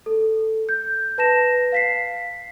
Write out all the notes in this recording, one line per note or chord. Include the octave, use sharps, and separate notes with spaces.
A4
G6
B4 A5 A#6 E7
F5 B6 C7